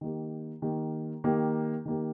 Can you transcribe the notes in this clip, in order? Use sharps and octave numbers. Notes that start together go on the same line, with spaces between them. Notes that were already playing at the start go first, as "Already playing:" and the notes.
D#3 A#3 G4
D#3 A#3 G4
D#3 A#3 G4
D#3 A#3 G4